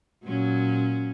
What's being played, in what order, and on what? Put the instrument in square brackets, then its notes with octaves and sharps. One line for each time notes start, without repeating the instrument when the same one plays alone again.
[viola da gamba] A#2 F#3 C#4